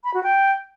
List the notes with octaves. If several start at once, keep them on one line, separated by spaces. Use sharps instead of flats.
B5
F#4
G5